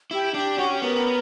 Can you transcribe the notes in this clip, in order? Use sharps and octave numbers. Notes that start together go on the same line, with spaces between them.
E4 G4
D4 G4
C#4 F#4
G4
B3 A#4